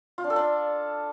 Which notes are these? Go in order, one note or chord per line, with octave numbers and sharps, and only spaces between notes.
F4
D4
A4
D4